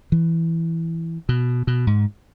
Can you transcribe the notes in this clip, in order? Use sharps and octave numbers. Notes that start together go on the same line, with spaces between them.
E3
B2
B2
G#2